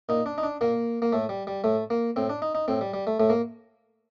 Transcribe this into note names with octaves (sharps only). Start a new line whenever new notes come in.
A#2 D#4
D4
D#4
D4
A#2 A#3
A#3
A2 A3
G3
G3
A2 A3
A#3
A2 C4
D4
D#4
D#4
A2 C4
G3
G3
A3
A2 A3
A#3